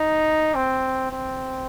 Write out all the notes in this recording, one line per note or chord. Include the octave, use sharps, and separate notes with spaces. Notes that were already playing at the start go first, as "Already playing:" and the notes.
Already playing: D#4
C4
C4